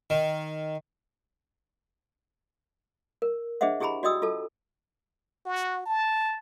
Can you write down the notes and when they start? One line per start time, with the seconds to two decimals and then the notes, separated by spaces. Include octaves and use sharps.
0.10 D#3
3.22 A#4
3.61 D4 G#4 C5 D#5 E5 F#5
3.80 E4 G4 G#4 G#5 A#5 B5
4.03 F#4 D5 D#5 G5 D#6 E6
4.22 F4 A4 A5
5.46 F#4
5.86 A5